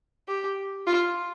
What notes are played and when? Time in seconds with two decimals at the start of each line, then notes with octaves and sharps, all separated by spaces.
0.28 G4
0.87 F4